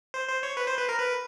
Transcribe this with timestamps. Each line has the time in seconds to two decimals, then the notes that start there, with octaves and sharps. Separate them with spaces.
0.14 C5
0.28 C5
0.43 C#5
0.57 B4
0.67 C5
0.78 B4
0.89 A#4
0.99 B4